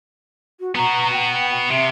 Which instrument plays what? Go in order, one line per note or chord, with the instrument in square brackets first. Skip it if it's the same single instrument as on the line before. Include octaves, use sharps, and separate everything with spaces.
[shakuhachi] F#4
[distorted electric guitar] B3 F#4 [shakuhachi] A#5
[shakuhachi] G5
[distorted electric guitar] C3 [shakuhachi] E5